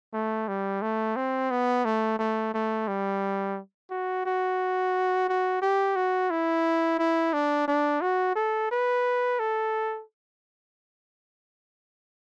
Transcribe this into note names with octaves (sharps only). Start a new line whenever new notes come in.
A3
G3
A3
C4
B3
A3
A3
A3
G3
F#4
F#4
F#4
G4
F#4
E4
E4
D4
D4
F#4
A4
B4
A4